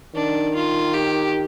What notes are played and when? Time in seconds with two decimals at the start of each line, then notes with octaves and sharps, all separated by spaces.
0.15 D#3 D4
0.55 F4
0.94 G4